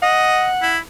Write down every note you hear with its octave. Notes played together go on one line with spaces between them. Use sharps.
D#5 F#5
E4